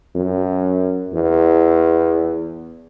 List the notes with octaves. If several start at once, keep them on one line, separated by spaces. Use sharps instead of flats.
F#2
E2